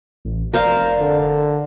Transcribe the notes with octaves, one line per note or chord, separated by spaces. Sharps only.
A1
F1 A#4 C5 D5 F5
D3